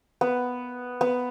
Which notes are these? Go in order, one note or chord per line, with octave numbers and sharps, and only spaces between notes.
B3
B3